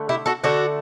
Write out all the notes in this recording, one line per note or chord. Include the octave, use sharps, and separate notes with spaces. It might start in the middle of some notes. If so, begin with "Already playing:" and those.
Already playing: D3 A3
E4 G4
F#4 A4
D3 A3 D4 F#4